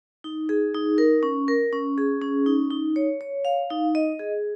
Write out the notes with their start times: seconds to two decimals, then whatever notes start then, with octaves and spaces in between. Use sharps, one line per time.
0.24 D#4
0.49 G#4
0.74 D#4
0.98 A#4
1.23 C#4
1.48 A#4
1.73 C#4
1.98 G#4
2.22 C#4
2.46 D#4
2.71 D#4
2.96 C#5
3.21 C#5
3.45 F5
3.70 D#4
3.95 D#5
4.19 G#4